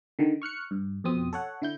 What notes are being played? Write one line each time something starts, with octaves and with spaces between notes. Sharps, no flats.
D3 D#3
C#6 F6 F#6 C#7
G2
F2 B2 C4 D#6
A4 C#5 F#5
D3 E4 G6